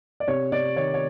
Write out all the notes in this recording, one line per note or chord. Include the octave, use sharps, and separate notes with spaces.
D5
C3 C#5
C3 D5
D#3 C#5
C#5